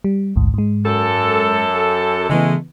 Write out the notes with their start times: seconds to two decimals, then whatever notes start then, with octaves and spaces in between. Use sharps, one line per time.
0.04 G3
0.36 A1 D2 G#2
0.54 G#2 G#3
0.85 F#2 A4
2.30 C#3 E3 G#3 A3 B3